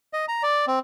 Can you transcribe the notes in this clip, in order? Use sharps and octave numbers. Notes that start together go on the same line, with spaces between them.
D#5
A#5
D5
C4